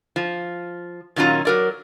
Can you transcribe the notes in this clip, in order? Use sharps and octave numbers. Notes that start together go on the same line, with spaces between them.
F3
A#2 D#3 F#3 C#4 F4 A#5
F#3 A#4 D5